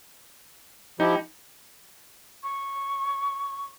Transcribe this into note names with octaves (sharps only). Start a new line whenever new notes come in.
F3 D#4 E4 G4
C#6